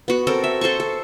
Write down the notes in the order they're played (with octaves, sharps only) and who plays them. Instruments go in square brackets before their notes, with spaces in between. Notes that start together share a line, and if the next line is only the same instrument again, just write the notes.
[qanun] B3 F#4
C4 A4 A#4
E5
A4 C5 A5 C#6
A4